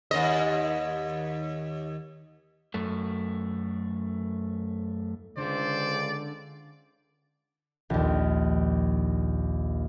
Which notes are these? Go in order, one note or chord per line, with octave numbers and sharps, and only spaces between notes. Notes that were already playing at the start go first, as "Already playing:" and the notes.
D#2 D#5
F#2 A3
C#2 D3 C5 D5
A#1 D#2